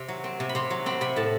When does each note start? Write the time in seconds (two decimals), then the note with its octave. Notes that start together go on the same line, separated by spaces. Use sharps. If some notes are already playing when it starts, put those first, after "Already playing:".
Already playing: C3
0.08 F#3
0.24 C4
0.40 C3
0.49 B5
0.55 C3 C6
0.70 F#3
0.86 C4 B5
1.01 C3 B5
1.16 A2 A5